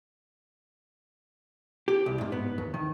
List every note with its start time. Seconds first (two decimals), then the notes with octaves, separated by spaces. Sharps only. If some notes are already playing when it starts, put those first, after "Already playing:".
1.88 G4
2.06 C2
2.21 G#2
2.32 B3
2.58 D#2
2.74 D#3